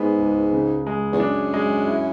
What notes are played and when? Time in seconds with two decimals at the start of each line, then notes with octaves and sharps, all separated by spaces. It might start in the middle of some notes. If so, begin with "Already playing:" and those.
Already playing: G#2 B3 G#4
0.19 C#2
0.53 C#3
0.87 G#3
1.13 E2
1.20 F#2 D4
1.54 G#3
1.87 E4